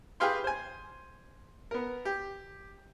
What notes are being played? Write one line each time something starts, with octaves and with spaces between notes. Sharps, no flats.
G4 G#4 B4 F5 G5 C6
C5 G#5
B3 A#4
G4